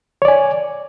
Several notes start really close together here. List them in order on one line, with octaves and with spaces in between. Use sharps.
C#5 D5 G#5